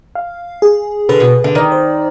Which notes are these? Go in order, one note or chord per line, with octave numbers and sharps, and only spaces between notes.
F5
G#4
D3 B4
B2
D3
D#3 D5
C5